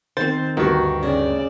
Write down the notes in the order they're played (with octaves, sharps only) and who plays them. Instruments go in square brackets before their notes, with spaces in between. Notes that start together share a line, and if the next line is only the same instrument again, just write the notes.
[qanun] D#3 C4 [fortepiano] C5 [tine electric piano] A6
[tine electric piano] D2 G2 [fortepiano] D#3 F#4 [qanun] G4
[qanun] C#3 [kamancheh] D5